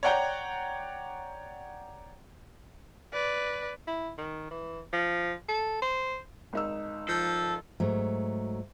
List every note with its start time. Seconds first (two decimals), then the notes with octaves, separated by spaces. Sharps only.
0.03 C#5 D5 F#5 G5 A#5 G6
3.13 B4 D5
3.87 E4
4.18 D#3
4.51 E3
4.93 F3
5.49 A4
5.82 C5
6.53 G#1 D#4 E6
7.09 F3 A4
7.80 G#2 F#3 A3